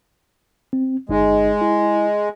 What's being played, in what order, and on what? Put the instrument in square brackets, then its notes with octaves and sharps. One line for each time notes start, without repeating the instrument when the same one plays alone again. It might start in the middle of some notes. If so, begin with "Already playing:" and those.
[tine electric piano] C4
[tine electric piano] G1 D#4 D#5 [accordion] G#3
[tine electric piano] E4